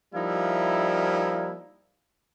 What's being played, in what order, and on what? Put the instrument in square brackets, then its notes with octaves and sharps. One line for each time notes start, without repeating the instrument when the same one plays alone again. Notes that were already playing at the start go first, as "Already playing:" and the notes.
[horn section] F3 G3 A#3 D#4 E4